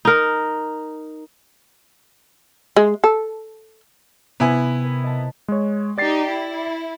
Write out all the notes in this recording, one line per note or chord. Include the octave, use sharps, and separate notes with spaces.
D#4 A#4
G#3
A4
C3 B3 E4 G#5
A#4
D#5 A5 B6
G#3 C#5
D#4 G4 D5 A6 C7
E4